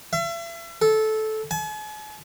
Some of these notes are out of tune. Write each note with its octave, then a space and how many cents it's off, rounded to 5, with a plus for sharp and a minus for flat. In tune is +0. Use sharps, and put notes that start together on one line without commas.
E5 +40
A4 -15
G#5 +45